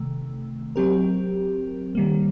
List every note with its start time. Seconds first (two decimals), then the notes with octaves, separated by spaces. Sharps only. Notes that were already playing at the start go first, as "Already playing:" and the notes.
Already playing: C3 D#3 A3
0.76 F#3 C4 G4 A#4
1.95 D#3 G3 A#3